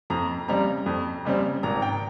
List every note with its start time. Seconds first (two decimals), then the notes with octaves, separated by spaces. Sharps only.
0.10 F2 A#5
0.48 C#3 G3 C4 A#5
0.86 F2
1.25 C#3 G3 C4
1.63 G#1 A#5
1.82 G5